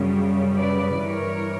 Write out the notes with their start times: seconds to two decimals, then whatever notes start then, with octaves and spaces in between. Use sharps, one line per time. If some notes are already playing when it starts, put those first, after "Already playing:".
Already playing: F#2 C#3 G3
0.57 B4 D5
1.05 G2 E3 G3 A#4 C#5